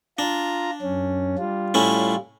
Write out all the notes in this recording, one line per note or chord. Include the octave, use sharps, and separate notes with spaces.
D4 F4 A#5
F#2 C#4
G3 F4
A2 C#4 E4